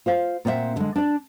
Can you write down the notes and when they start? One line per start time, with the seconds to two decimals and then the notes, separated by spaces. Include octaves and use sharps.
0.06 F4 C5 F5
0.45 A#2 B3 C4 D5 E5 F#5
0.76 D3 G#3
0.96 D4 D5